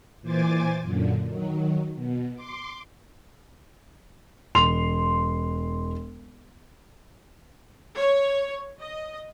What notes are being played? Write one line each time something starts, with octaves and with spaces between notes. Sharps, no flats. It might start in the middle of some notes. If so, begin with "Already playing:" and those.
A#2 E3 C5 G#5 D6 A6
F#2 A#2 D3
D#3 F#3
B2
C6 D6
E1 C6 F7
C#5
D#5